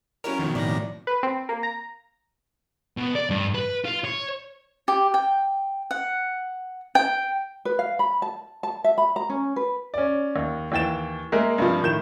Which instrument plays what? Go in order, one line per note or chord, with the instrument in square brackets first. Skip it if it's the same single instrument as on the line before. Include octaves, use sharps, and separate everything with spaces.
[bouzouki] F#3 E4 C#5 [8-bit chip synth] C#4 A#4
[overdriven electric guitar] F2 B2 [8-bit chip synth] D#3
[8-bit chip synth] A2 D#3 A#6 [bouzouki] D5
[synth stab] B4
C4
A#3
A#5
[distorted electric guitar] B2
D5
G2
B4
F4
C#5
[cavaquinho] G4
G5
F#5
G5
[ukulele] B4
F5
B5
A5
A5
E5
B5
A#5
C#4
B4
[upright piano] C#4 D5
D#2
D#2 E3 G5 A6 E7
G#3 A#3 A#4 E5
G2 C3 F3
A2 D#3 G6 E7